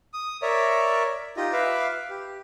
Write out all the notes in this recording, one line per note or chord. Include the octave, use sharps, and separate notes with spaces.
D#6
A#4 C#5 D5 E5
D#4 F4 G4 D#5
B4 E5 F5 D6
G4